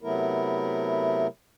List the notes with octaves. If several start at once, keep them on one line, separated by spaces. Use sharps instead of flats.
C3 F#3 A3 B3 E4 A#4